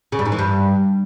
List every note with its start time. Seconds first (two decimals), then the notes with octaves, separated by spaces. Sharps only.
0.12 C#3
0.19 G2
0.25 G#2
0.32 E3
0.39 G2